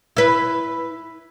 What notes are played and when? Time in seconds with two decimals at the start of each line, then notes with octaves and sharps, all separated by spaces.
0.17 E4 B4